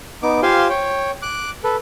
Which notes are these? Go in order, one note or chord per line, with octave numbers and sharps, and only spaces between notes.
B3 D#4 D6
F4 G4 C5 F5 G#5 C6
C#5 G5
D6 F#6
A4 B4